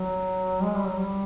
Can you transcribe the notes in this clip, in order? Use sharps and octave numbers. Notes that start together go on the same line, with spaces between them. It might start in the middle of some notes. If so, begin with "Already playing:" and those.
Already playing: F#3
G#3
G3
F#3
G3